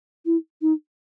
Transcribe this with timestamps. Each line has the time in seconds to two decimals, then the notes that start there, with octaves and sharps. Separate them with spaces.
0.26 E4
0.62 D#4